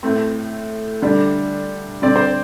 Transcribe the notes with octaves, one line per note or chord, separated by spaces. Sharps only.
A2 A3 C4
D3 G3 D4
D3 G3 C4 D5
C5